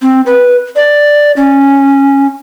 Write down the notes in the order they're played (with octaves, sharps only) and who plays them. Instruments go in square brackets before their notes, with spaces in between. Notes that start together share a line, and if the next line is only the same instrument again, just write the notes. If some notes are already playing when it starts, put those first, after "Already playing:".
[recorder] C4
B4
D5
C#4